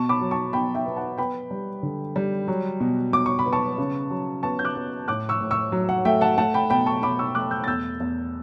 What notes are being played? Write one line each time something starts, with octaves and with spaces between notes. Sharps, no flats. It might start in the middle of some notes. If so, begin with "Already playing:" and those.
Already playing: B2 A5 C#6
B5 D6
F#3
A5 C#6
B2 G5 B5
E5 G5
B3
F#5 A5
B3 G5 B5
G3
D3
G3
F#3
B2
B2 D6
C#6
B5
B3
A5 C#6
C#3
F#3
B3 A5 C#6
G6
D6 F#6
B3
A2 D6 F#6
C#6 E6
A2
C#6 E6
F#3
F#5
A3 E5 G5
F#5 A5
A3 F#5 A5
G5 B5
B2 G5 B5
A5 C#6
B2 B5 D6
C#6 E6
A3 D6 F#6
E6 G6
A6
E2 E6 G6
E2